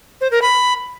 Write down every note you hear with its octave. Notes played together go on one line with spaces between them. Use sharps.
C5
A#4
B5